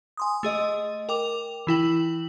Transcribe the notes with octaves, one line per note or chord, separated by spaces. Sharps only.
G#5 C6 D#6
A3 G#4 D#5
A#4 G5 D6 F7
E3 E4 G5 F#7